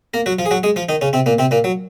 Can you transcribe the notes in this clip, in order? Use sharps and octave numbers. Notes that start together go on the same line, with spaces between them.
A#3 A#4
F#3 F#4
F3 F4
G#4
F#3 F#4
G#3 G#4
F3 F4
D#3 D#4
C#3 C#4
C3 C4
A#2 A#3
C3 C4
A#2 A#3
F#3